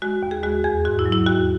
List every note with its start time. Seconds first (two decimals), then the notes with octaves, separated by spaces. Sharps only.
0.02 G#3 F#4
0.23 D#2
0.31 G#4
0.43 G#3 F#4
0.64 E2 G#4
0.85 G#2 F#4
0.99 E4
1.06 F#3
1.12 E4
1.26 D#2 F#4